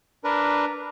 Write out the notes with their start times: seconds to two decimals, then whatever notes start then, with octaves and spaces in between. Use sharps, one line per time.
0.24 D4 A#4 B4